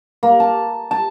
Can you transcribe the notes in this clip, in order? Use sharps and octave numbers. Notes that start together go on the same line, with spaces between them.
A#3
A5
A5